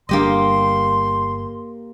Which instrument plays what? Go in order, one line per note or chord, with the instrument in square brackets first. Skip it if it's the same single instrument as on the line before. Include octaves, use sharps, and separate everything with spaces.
[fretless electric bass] G1 G3 D4 [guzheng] A#3 G4 D#5 [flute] C6